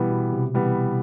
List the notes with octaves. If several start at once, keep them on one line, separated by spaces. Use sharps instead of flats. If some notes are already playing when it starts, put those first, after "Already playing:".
Already playing: B2 E3 G3 B3
B2
C3
E3 G3 B3